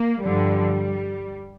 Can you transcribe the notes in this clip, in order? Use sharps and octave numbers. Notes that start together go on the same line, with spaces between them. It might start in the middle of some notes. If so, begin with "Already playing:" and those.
Already playing: A#3
G2 D3 F3 G3